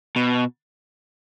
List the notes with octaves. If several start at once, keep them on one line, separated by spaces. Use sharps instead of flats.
B2